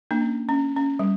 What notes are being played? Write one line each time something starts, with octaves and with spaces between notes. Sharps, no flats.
A#3 D4
C#4
C#4
C#4
G3